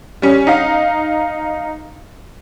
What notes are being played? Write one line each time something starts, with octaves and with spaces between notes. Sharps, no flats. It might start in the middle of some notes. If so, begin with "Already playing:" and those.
G3 C#4
D#4 F5